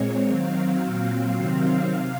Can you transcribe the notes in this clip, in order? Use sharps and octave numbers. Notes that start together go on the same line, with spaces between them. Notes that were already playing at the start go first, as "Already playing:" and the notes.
Already playing: A#2 G#3 C4 C#5
D#3 F#3 C4 F5
A#2 F#3 C4
C3 D#3 F#3 C4
C3 F5